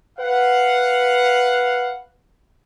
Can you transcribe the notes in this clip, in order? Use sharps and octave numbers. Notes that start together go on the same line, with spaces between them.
B4 F5 F#5